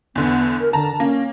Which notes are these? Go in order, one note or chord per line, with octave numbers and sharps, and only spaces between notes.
E2 D3 B3
A#4
D3 A5 A#5
A#3 C#4